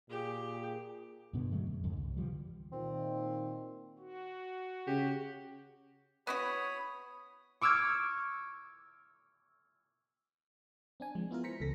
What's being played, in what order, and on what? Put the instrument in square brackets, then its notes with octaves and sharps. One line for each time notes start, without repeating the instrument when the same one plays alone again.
[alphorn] A#2 [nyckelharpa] G4 [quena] G#4
[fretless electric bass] G2 B2 D3 B3
D3 F#3 G#3 A3
F#2
F2 G#2 D3
C2
D3 E3 F3 G3
[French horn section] A#2 D#3 [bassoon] C4
[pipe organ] F#4
[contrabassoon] C#3 [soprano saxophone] G4
[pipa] B3 E4 F#4 [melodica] C#5 B5 D#6
[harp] C#6 D6 E6 F6 G#6
[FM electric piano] C4 D4 G#5
F3 G#3
B3 E4 F4 A#4
C5 A#5 B6 C#7
C#2 E3 A4 A#6 B6